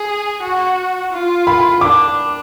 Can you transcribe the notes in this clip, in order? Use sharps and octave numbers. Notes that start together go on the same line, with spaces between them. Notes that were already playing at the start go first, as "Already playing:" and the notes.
Already playing: G#4
F#4
F4
B5
D4 D6